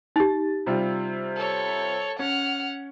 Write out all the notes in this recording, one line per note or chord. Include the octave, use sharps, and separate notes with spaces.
D#4 G4 A6
C3 G3 F4
A4 C#5
C#4 F#5 F6